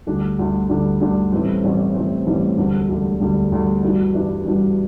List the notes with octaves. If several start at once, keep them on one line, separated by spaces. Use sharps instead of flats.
D2 D3 G3 D4
D2 D3 G3 D4
D2 D3 G3 D4
D2 D3 G3 D4
A1 A2 E3 G3 C4
A1 A2 E3 G3 C4
A1 A2 E3 G3 C4
A1 A2 E3 G3 C4
E1 D2 D3 G3
E1 D2 D3 G3
E1 D2 D3 G3
E1 D2 D3 G3
G2 E3 G3 D4 F#4
G2 E3 G3 D4 F#4
G2 E3 G3 D4 F#4